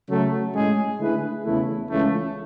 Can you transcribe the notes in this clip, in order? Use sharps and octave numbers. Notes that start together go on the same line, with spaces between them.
C#3 F#3 A3
A2 G#3 C#4 G#4
D3 A3 E4 G#4 B4
E2 C#3 E3 A3 E4
C#2 C#3 E3 A3